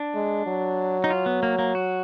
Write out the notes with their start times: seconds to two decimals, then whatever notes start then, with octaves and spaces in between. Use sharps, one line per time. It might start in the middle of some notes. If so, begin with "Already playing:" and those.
Already playing: D4
0.15 G#3
0.47 F#3
1.04 D#4
1.10 F4
1.26 B3
1.43 A#3
1.59 A#3
1.75 F#4